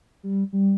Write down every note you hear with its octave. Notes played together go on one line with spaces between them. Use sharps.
G3
G3